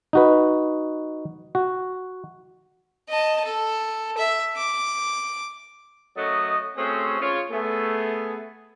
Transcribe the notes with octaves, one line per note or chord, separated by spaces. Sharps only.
D#4 F#4 B4
F#4
D#5 A5
A4
E5
D6
F#2 F#3 A3 F#4 D#5
A3 C4 C#4 F#4 G#4 C5
C#3 F4 C#5
A3 B3 G#4